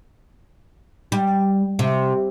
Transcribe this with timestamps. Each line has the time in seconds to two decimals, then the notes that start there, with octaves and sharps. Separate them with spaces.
1.12 G3
1.79 C3